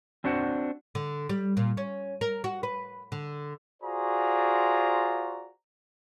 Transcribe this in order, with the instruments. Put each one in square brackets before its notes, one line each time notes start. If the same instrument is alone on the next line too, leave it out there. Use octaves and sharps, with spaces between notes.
[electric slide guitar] C4 D4 F#4 C5 F#5
[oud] D3
G3
A#2
C#4
A#4
F#4
B4
D3
[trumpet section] F4 F#4 G#4 C5 D5 A#5